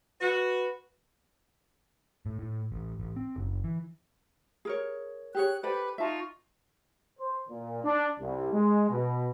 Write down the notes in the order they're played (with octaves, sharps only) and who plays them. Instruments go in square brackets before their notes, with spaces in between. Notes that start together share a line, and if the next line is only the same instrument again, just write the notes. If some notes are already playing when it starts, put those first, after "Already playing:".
[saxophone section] F#4 [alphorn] B4
[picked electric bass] A2
A2
A1
A1
C4
F#1
E3
[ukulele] G#4 A#4 C#5
[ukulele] G4 G#4 C#5 [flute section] F#6
[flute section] G4 B4 [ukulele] A4 C5 D5
[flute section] D#4 F4 C#6 [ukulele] E5 A5
[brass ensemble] C5
A#2
D4
C2
G#3
B2